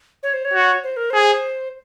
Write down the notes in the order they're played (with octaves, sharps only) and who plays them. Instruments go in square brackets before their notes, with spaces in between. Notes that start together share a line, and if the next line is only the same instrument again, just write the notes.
[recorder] C#5
C5
C#5
[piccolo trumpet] F#4
[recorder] C5
A#4
[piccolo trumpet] G#4 [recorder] C5